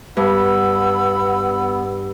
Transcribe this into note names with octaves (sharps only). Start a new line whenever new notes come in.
G2 B3 F#5 B5 E6